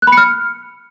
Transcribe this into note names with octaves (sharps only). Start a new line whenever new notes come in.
F#6
B5
C#7
F6